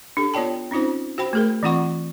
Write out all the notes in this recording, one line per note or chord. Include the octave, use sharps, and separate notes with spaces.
D4 G4 A4
B3 F4 C#5 D5 G5 A5
C4 C#4 D#4 F4 C5
F#4 C5 G5 B5
A3 G#4 A#4
E3 C4 F4 F#5 C#6